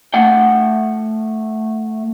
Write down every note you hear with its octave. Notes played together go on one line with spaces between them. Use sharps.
A3 F#5 G5